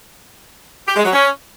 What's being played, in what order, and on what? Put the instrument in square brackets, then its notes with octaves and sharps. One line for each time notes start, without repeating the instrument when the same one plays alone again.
[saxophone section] G4
G#3
F#3
C#4